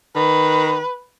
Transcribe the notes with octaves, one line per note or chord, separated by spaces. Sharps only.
D#3 B4